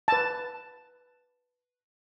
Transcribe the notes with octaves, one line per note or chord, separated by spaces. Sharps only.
B4 A5